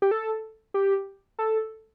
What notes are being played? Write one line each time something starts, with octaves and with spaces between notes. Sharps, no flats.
G4
A4
G4
A4